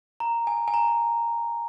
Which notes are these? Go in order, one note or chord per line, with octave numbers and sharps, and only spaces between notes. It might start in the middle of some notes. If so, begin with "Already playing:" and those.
A#5
G#5
G#5
A#5